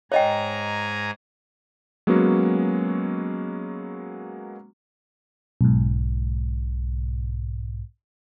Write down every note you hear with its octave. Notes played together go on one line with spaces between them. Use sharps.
G#2 C#5 D#5 G5 G#5 A#5
F#3 G#3 A#3 B3 C#4 F#4
B1 G#2